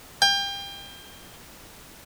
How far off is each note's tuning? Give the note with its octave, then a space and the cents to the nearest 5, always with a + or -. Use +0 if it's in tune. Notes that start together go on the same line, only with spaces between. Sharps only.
G5 +30